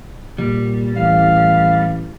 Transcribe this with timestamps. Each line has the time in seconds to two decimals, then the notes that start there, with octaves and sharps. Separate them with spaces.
0.38 A#2 G3
0.96 A1 F5